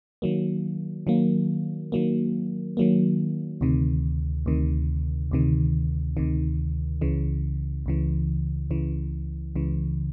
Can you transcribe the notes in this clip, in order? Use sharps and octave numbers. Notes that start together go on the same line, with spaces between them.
D#3 F#3 A#3
D#3 F#3 A#3
D#3 F#3 A#3
D#3 F#3 A#3
D2 C3 D#3
D2 C3 D#3
D2 C3 D#3
D2 C3 D#3
C#2 C#3 E3
C#2 C#3 E3
C#2 C#3 E3
C#2 C#3 E3